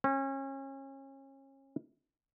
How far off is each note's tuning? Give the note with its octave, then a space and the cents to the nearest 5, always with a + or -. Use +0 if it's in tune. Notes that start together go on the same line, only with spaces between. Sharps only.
C#4 -30